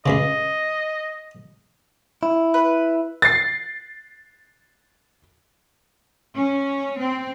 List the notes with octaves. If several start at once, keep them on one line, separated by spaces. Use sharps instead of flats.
C#2 G2 C#3 D#5
E4
B4
A6 C7
C#4
C4